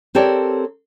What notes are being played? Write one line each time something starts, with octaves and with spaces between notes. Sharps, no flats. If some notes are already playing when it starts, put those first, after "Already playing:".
C4 G4 A4 A#4 C#5 D5